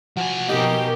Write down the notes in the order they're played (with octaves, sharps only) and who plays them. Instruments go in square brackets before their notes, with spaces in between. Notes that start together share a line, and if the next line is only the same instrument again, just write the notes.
[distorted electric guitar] F3 G#5 [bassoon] F#4
[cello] B2 A#4 [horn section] C#4 G4 [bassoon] D#4